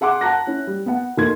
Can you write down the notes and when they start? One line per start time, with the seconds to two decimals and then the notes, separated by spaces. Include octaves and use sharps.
0.01 G#4 F#5 C6 D6 F#6
0.21 F#5 A5 A#5 F#6 A#6
0.47 C#4 E4
0.67 G3
0.86 B3 F#5
1.17 F1 A#3 C6 G#6